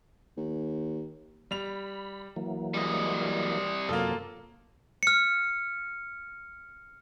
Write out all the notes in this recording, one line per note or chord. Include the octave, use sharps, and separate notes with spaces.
D#2
G3 B5 F7
E3 F#3 A#3
G3 G#3 D#5
F#2 C3 F#3 A#3 F4 A4
F6 C#7